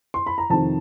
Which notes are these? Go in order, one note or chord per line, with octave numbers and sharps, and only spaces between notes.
C6
B5
A#5
F2 C3 D#3 A5